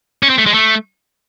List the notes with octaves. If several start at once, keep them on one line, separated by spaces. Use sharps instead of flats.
C#4
C4
A3
G#3
A3